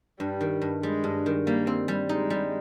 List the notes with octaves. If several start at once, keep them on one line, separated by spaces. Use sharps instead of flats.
G2 G3
D#3
G2
G3 G#3
G2
D#3
G3 A#3
C4
G3
G#3 D#4
G3